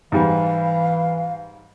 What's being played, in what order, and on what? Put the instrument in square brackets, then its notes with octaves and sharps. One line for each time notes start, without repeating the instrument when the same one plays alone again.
[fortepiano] G#2 G3 [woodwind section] E3 [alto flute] F5